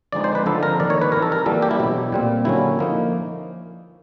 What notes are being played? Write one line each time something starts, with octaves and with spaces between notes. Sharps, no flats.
D3 F3 G#3 C4 D#4 D5
C5
B4
D3 F3 A3 C4 D#4 A4
A#4
D#3 G3 A#3 D5
C#5
B4
E3 G3 C4 D#4 A#4
A4
A#4
E3 G3 A#3 A4
G4
E4
B2 F#3 A3 D4
A#2 G3 C4
D3 F#3 A#3 C#4 E4
F3 A#3 D#4